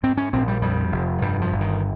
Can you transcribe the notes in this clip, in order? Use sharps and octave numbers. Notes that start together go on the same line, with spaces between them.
G#2 C4
C#4
A#1 C4
G3
F2 G3
F1
G2 G3
F3
G1
D#3